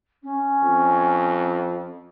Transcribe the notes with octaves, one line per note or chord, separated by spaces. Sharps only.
C#4
F2